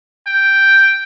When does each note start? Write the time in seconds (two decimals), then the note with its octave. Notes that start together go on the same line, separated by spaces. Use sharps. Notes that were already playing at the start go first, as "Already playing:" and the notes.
0.27 G5